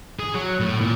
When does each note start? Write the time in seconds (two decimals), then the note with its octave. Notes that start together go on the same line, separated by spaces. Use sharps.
0.20 G#4
0.34 F#3
0.60 A2
0.81 A#2